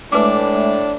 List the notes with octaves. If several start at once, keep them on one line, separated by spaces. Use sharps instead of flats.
A2 G#3 A3 D4 B4 E5 D6